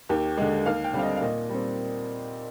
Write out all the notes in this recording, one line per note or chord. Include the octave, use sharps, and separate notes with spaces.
D#2 G4
D3 G#3
D#2 F5
G5
D3 G3 C4 F5
D#5
F5
A#2 D#5
G3 C4